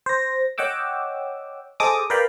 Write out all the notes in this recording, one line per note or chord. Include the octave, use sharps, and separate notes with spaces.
C5 A#6
C#5 D#5 F#5 G5 D6 E6
G#4 A4 C5 D#5 D6 D#6
A#4 B4 D5 F5 G5 B5